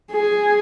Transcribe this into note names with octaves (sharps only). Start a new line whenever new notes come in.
G#4